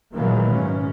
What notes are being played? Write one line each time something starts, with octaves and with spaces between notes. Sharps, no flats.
A#2 D#3 E3 F#3 G#3 A#3
G#2 C#4